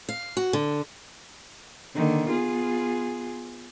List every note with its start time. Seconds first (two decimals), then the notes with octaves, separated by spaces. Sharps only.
0.09 F5
0.37 F#4
0.53 D3
1.95 D3 D#3 A#3
2.28 B3 F4 G#4